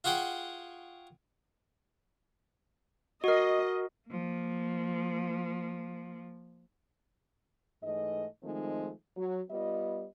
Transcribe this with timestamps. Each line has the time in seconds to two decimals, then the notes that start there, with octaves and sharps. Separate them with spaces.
0.04 F4 F#4 G#4 F#5 G5
3.24 F#4 A#4 D#5
4.08 F3 A#3
7.83 G#2 E3 G#3 A3 D#5
8.43 D#3 F3 G#3 A3 C4 D#4
9.17 F#3
9.51 G3 B3 F4 D#5